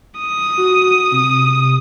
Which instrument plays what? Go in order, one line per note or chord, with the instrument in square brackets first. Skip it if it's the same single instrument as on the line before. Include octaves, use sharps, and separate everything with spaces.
[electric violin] D#6
[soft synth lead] F#4
C3